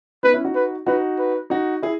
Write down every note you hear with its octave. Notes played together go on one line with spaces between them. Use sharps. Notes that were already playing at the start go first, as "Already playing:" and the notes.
B3 D#4 B4
C#4 E4
D#4 F#4
B4
D#4 F#4 B4
B4
D#4 F#4
E4 G#4